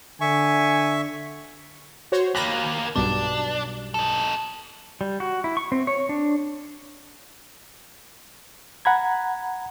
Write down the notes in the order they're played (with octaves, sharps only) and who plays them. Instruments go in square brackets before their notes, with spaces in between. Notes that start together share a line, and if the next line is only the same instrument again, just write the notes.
[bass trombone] D3 [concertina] E5 C#6 [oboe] G#5
[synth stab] F#4 C5 C#5
[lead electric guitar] D#2 A#3 [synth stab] B5 F#6 A#6
[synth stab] B1 G2 B2 [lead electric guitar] D4
[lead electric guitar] D#4 A4
[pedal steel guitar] G3
F#4
E4
C#6
C4
C#5
D4
[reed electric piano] F#5 A#5 B5 G#6